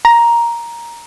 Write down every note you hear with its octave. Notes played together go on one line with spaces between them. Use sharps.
A#5